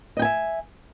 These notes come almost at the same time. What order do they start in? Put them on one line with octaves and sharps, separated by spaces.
D#5 G5 G#5 E5